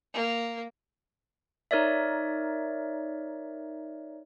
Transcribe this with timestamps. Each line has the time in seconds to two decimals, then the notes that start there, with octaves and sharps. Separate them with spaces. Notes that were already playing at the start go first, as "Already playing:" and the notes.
0.14 A#3
1.71 D#4 A#4 C#5 D5 E5